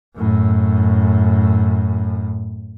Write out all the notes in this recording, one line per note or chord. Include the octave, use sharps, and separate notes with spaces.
F#2 A2